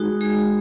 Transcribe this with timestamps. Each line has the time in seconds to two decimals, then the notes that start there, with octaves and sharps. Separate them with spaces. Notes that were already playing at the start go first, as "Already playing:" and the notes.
Already playing: G#3 D#4 F#4 G#4
0.21 G#3 G#4